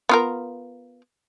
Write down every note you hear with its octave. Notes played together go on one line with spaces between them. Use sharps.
B3 F4 A#4